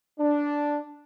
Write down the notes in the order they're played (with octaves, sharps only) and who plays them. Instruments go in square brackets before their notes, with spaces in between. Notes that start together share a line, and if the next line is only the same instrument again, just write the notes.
[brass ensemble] D4